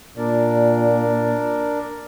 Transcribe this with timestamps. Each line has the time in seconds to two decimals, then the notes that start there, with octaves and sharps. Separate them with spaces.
0.18 A#2 D4 A#4 D5